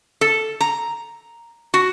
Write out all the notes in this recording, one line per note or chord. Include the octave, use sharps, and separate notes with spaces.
A4
A#5
F#4